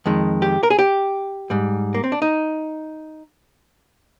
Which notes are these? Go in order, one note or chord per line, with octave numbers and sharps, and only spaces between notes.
F2 D#3 G#3
G4
A#4
G#4
G4
G#2 G3
A#3
C4
D4
D#4